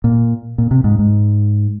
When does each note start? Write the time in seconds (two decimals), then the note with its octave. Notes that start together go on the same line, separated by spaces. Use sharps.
0.04 A#2
0.58 A#2
0.71 C3
0.84 G#2
0.99 G#2